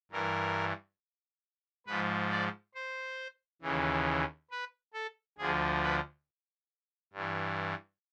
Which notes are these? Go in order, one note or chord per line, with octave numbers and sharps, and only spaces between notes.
G2 E3 A#4
G#2 F3 B4
D5
C5
D#2 C#3 E3
B4
A4
D2 D3 F3 G#4
B4
G2 E3